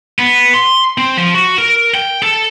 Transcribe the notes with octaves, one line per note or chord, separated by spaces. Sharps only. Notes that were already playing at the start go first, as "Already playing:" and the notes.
B3
C6
C4
F3
F#4
A#4
G5
A4